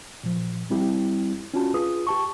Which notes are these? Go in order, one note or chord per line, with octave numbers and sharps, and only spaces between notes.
A#2 F3
G3 C4 E4 G4
C#4 D4 F4 F#4 A5
F4 G#4 B4 D#6
G4 A5 C#6